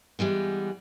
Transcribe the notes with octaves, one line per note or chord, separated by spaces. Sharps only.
E3 G3 G#3 B3